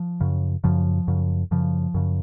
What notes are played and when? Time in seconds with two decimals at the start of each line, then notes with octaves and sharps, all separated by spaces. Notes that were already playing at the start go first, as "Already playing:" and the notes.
Already playing: F3
0.21 F#2 C#3
0.64 F#2 C#3 F3
1.08 F#2 C#3
1.51 F#2 C#3 F3
1.94 F#2 C#3